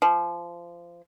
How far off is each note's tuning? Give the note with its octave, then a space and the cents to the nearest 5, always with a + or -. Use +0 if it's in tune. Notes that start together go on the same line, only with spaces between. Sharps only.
F3 -20